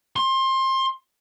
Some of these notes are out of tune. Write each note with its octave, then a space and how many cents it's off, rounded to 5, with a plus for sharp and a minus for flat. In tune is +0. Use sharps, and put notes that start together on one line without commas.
C6 +25